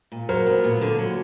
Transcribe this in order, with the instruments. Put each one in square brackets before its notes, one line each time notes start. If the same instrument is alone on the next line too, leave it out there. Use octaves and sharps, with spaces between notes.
[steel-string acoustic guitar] A#2
[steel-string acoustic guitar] F#3 [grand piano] A#4 C5
[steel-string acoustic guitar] B3
A#2
D3
F#3